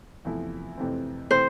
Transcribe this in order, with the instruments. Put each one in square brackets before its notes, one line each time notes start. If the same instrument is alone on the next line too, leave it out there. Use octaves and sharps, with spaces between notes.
[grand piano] E2 C3 F3 A3 E4
F2 C3 E3 A3 C4
[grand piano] C3 E3 A3 C4 [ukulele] C5